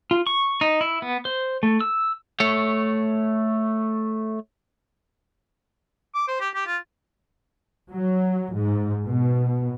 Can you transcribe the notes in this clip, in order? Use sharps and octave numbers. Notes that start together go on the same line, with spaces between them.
F4
C#6
D#4
E4
B3
C5
A3
E6
A3 C#5
D6
C5
G4
G4
F4
F#3
G#2
B2